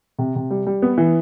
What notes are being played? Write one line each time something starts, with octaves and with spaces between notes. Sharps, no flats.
C3
C3
G3
G3
B3
E3